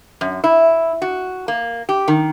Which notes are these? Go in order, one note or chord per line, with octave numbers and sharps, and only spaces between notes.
F#2
E4
F#4
A#3
G4
D#3